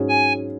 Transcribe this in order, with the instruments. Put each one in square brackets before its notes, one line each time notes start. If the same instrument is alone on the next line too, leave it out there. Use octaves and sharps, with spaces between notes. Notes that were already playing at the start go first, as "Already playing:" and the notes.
Already playing: [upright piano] G#2 F#3 C#4 G#4
[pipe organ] G#5